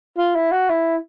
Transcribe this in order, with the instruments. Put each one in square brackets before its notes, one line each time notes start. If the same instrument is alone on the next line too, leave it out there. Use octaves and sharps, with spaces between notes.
[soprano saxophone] F4
E4
F#4
E4